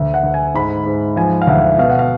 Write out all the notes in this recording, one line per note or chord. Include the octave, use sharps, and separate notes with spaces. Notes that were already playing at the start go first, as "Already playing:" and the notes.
Already playing: D2
F#5
D2
G#5
G#2 B5
G#2
F3 G#5
F5
D2 F#5
B2 F5
F#5
F5